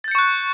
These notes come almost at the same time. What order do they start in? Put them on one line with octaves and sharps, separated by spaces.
A6 G6 C#7 C#6 F#6